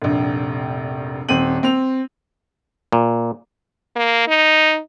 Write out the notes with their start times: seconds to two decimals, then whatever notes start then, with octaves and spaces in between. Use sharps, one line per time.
0.02 F1 A#1
1.29 D#1 C4 D#7 F#7
1.63 C4 F7
2.92 A#2
3.96 A#3
4.28 D#4